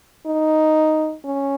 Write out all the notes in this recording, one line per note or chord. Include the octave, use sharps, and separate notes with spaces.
D#4
C#4